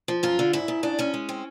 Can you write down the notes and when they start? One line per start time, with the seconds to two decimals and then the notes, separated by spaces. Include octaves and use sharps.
0.08 F3
0.23 F#2 F4
0.39 D3
0.53 G#2 E4
0.68 G#2
0.83 C#3 D4
0.99 D2 C#4
1.14 G#3
1.29 C4